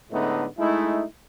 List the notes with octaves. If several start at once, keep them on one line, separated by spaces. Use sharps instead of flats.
A2 D3 G#3 A3 B3 D#4
G#3 A3 D#4 E4